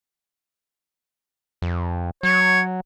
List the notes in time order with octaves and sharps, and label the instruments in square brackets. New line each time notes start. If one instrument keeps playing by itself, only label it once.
[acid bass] F2
[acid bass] F#3 [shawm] C#5